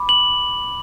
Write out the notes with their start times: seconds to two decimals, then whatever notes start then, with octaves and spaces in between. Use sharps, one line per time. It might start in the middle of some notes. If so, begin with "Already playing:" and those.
Already playing: B5 D6
0.09 F#7